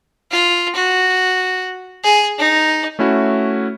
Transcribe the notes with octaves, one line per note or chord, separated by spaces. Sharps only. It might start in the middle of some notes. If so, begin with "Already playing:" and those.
F4
F#4
G#4
D#4
A3 C#4 E4 F#4